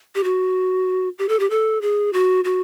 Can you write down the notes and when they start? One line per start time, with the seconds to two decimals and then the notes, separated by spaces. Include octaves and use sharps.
0.15 G4
0.24 F#4
1.19 G4
1.29 A4
1.40 G4
1.50 A4
1.82 G#4
2.13 F#4
2.44 F#4